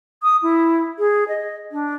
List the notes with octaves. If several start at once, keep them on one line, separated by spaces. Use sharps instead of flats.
D#6
E4
G#4
D#5
D4